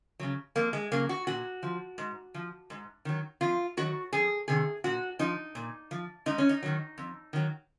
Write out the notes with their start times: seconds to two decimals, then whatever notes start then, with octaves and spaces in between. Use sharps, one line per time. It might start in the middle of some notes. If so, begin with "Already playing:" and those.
0.20 C#3 F#3
0.55 F2 A#3
0.73 G#3
0.92 C#3 F#3 A#3
1.09 F#4
1.27 A#2 F#4
1.63 F3
1.98 G#2
2.34 F3
2.70 G#2
3.05 D#3 F#3
3.41 F2 F4
3.77 D#3 F#3 F#4
4.13 F2 G#4
4.48 C3 D#3 G#4
4.84 A#2 F#4
5.19 F3 D#4
5.55 A#2
5.91 F3
6.26 G#2 D#4
6.38 C#4
6.49 D#4
6.63 D#3 F#3
6.98 F2
7.33 D#3 F#3